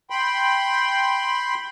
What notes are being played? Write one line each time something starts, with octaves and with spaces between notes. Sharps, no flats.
G5 B5 C6